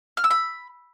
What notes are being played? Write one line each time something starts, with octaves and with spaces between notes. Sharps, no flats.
F6
E6
B5